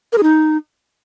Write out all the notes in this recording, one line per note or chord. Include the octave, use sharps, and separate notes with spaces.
A#4
G#4
D#4